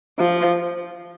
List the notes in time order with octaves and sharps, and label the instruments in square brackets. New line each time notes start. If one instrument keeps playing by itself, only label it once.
[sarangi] F3